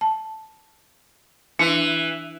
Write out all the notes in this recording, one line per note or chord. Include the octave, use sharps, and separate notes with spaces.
A5
E3 D4